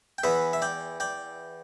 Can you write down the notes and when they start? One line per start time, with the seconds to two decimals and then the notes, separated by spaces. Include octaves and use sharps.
0.18 G5
0.24 E2 E3 B3 B4 E5
0.53 E5
0.62 D5 G5
1.00 D5 G5